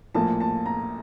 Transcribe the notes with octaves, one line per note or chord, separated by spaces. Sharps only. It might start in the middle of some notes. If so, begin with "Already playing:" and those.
A#1 A2 F3 A#3 A5
A5
A#5